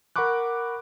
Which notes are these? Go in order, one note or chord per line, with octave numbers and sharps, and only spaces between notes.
A#4 F#5 B5 C#6 D6 F#6